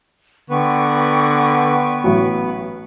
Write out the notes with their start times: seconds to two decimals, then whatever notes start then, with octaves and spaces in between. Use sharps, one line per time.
0.50 D3 B3 B4 G5 C#6
2.04 A1 F#3